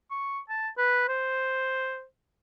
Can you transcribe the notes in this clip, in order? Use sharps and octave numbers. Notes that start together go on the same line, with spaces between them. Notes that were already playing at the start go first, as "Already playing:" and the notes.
C#6
A5
B4
C5